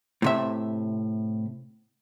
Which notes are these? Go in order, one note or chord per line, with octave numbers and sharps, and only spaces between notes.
A2 C3 E5